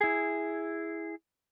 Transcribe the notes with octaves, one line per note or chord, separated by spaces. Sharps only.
E4 G#4